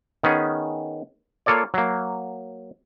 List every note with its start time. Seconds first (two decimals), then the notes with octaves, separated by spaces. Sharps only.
0.23 D#3 B3 C#4 G#4
1.46 A#3 F4 A4 C#5 D5
1.74 F#3 A#3